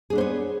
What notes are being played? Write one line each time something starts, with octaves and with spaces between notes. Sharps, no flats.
B3 D4 G#4 C5 C#5